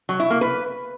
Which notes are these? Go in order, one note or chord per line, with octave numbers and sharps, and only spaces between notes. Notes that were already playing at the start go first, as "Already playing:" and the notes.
F#3
E4
A#3
B4